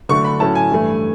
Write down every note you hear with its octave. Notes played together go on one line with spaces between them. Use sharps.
D3 F#3 A3 D4 C#6
B5
A2 F#3 A3 C#4 E4 A5
G#5
G2 E3 A3